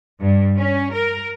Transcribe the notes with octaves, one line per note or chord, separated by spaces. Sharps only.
G2
C#4
A#4